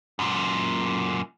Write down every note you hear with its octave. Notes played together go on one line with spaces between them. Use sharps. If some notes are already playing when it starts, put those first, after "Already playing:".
F#2 A#2